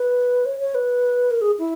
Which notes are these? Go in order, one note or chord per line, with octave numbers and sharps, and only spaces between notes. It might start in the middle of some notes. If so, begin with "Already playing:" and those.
Already playing: B4
C#5
C#5
B4
A#4
G#4
E4